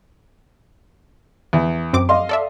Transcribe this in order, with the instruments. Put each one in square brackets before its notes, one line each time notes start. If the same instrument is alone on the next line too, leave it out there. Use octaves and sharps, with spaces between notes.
[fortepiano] E2
[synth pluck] F#2 C4 D6
[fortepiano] D#5 F5 C6
[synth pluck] A4 D5 E5